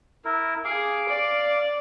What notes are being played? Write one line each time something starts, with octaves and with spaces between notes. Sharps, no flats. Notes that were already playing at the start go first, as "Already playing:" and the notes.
E4 A#4
G#4 F5 D6
D5